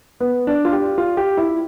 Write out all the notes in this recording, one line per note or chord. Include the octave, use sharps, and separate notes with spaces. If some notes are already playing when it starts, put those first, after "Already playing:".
B3
D4
F4
G4
F4
G4
E4